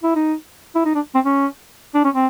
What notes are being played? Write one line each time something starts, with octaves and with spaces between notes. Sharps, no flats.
E4
D#4
E4
D#4
D4
C4
C#4
D4
C#4
C4